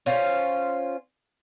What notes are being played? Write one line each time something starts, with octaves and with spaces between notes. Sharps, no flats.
C#4 F4 C5